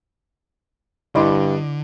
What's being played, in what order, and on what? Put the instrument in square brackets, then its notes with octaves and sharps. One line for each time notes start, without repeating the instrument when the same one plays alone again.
[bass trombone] G2 [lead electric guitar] D3 [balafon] E4 B5 C6 [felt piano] D5 D#5 D6